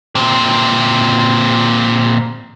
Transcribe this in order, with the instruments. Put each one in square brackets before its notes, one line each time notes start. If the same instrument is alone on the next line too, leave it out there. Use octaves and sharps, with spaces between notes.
[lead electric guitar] A#2 C4